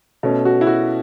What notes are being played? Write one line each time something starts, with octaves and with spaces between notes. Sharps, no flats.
B2 A3 C#4
F#4
E4
F#4